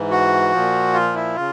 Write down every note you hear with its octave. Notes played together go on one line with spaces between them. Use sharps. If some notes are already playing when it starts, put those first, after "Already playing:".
Already playing: G#2 E3
F#4
A#2 F3
F4
E4
C#3 F4